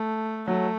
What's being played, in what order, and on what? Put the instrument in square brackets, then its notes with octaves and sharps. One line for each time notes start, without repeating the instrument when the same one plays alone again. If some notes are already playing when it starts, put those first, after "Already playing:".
Already playing: [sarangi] A3
[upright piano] F#3 [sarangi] A3